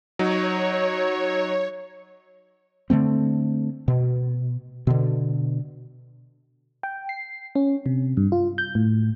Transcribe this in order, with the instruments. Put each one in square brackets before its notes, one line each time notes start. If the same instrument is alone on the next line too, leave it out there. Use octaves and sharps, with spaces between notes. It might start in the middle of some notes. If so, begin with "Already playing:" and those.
[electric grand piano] F#3 D#4 [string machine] C#5
[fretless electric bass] D3 E3 A3 C4
B2
B2 D3
[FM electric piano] G5
C7
C#4
C3
G2
F4
G6
A2